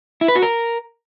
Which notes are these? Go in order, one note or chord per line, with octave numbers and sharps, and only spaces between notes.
E4
B4
F#4
A#4